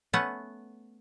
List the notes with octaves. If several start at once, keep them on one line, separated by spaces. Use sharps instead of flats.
A3 B3 C#4 B4 F#5